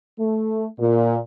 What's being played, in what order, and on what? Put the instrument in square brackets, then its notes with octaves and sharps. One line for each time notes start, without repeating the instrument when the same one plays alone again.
[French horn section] A3
A#2